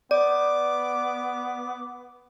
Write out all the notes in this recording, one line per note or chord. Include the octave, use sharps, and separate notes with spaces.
B3 D5 D6